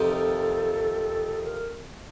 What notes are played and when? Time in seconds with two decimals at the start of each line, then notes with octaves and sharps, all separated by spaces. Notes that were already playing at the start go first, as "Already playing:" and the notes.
Already playing: F2 C3 D#3 A4
1.44 A#4